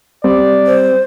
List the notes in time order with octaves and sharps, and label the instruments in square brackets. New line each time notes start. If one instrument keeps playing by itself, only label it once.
[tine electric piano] G3 [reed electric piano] C4 [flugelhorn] D5
[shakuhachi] C5